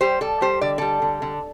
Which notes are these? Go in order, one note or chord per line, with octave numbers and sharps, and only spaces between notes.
G3 G4 C5
G3 A4 D5
G3 G4 C5
D3 D5
G3 A4 D5
D3
D3